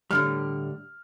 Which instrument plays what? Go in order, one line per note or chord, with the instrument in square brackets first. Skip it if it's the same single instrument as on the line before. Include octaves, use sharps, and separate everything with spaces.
[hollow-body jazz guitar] A2 D3 G3 [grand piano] F6